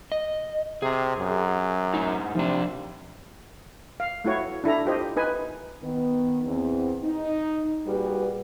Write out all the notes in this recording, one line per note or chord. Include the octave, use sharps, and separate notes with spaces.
D#5
C3 G#4
F#2
A2 D#4
C3 F3 D4
F5
A3 E4 F#4 C#5
D4 E4 A4 A#5
F4 G4 C5 D#5
D#4 B4 G#5
D#3 B3
E2 C4
D#4
A#2 G3 F#4 G#4 B4